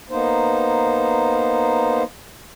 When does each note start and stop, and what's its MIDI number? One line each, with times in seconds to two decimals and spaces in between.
0.10 2.03 58
0.10 2.03 59
0.10 2.03 63
0.10 2.03 72